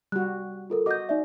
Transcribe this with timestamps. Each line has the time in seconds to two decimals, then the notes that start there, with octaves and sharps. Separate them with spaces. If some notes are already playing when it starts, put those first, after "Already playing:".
0.12 G3 F#4 F#6
0.70 F4 A4 A#4
0.86 F#4 D#5 D6 G6
1.09 D#4 D5 E5